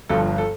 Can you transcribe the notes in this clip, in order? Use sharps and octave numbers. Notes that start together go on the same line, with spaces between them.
G1 G2 F3 A4
A4